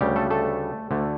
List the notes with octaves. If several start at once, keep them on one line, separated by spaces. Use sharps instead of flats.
D2 C#3 G3 G4
A3 A4
A3 A4
D2 D3 A3